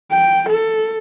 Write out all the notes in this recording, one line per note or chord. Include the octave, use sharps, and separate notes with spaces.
G5
A4